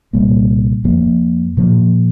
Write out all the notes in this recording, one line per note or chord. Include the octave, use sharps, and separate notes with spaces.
C2 A#2 G3 A#3
F2 F3 A#3
A#2 F3 A#3